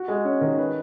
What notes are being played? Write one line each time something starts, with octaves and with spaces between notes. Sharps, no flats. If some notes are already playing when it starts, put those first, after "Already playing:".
Already playing: F#4
G#3
C#4
D#3
B4